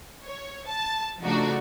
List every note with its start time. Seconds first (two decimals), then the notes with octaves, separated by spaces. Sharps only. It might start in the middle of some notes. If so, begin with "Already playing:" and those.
0.25 C#5
0.69 A5
1.21 C#3 F3 A3 D4 D#4 F#4